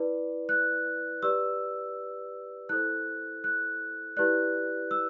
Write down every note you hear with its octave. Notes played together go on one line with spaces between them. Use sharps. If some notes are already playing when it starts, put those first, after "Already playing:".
Already playing: E4 B4 D5
F#6
G4 B4 D5 E6
E4 A4 C5 F#6
F#6
E4 G4 B4 D5 F#6
E6